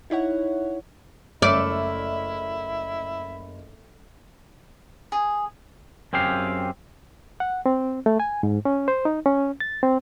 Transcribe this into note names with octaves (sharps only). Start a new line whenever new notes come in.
D#4 E4 C#5 F#5
F#1 A3 C#5 D5 E5 B5 F6
G#4
F#2 C4 G4 G#4 F5
F#5
C4
A3
G#5
G#2
C#4
C5
D#4
C#4
A6
C4